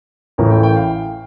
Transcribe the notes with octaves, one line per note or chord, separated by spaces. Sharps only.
A1 A2 E3 A3 A#4
G5
G5
F5